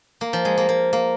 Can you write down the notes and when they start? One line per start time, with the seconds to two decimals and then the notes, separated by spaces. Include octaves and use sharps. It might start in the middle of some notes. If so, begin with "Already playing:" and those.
0.21 A#3
0.33 F3
0.45 G#3
0.58 A#3
0.69 A#3
0.93 A#3